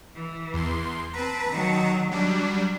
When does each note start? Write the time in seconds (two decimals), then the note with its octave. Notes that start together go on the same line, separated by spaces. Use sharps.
0.15 E3
0.54 E2 C6
1.13 C4 B4 A5 A#5
1.50 D#3 F#3
2.11 F#3 G3 D4